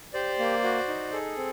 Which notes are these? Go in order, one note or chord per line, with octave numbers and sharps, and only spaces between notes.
G4 C5 D5
A#3
F#4
D#4
G#4 A4
C4